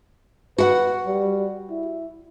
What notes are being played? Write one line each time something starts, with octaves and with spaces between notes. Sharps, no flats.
F#4 B4 F#5
G3
E4